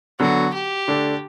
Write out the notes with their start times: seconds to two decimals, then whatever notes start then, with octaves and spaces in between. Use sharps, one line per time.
0.20 D3 F#3 B3 F#4
0.54 G4
0.87 D3 A3 D4